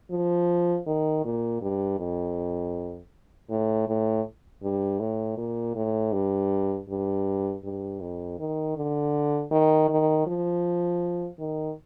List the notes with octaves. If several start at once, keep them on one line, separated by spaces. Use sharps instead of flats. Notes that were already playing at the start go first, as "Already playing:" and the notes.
F3
D#3
A#2
G2
F2
A2
A2
G2
A2
A#2
A2
G2
G2
G2
F2
D#3
D3
D#3
D#3
F3
D#3